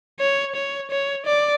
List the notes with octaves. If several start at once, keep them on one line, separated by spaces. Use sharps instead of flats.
C#5
C#5
C#5
D5